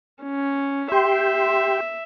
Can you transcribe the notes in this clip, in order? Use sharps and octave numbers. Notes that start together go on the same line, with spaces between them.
C#4
G4 E5 G5 C6